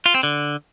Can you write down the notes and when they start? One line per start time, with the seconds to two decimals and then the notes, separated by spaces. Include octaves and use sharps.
0.06 F4
0.14 C4
0.23 D3